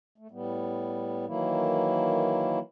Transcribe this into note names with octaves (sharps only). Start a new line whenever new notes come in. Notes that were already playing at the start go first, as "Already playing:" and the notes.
A3
A2 G3 B3
D#3 E3 F#3 A#3 E4